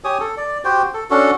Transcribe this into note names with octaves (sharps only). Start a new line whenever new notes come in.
G4 C#5 G#5 D#6
A4
D5
F#4 G4 C5 G5
A4
C#4 D4 F#4 A4